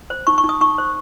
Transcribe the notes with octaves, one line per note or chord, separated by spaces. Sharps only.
C5
D#4 C#6
C#6
D#4
D#6
D#4 C#6
C5